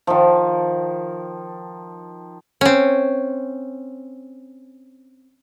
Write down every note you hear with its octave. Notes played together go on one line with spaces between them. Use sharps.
D#3 F3
C4 C#4